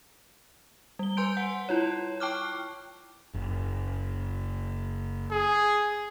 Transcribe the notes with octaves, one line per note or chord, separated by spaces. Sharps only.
G3 G7
B4 G#5 C6 G6 D7
F#5
E4 F4 C#5
G5 A5 C#6 D6 F6 F#6
F#1
G#4